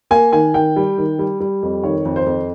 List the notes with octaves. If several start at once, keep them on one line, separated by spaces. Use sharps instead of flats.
A#3 G#5
D#3 G#5
D#3 G5
G3
D#3
G3
G3
F2
D#3 C#5
F2
C5
F2